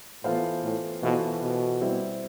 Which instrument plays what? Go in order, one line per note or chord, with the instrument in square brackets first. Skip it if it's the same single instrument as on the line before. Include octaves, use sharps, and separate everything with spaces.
[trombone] A2 [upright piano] E3 B3 F4 A4 C5
[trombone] A2
[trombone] B2 [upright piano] E3 B3 F4 A4 C5
[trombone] B2
[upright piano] G3 C4 E4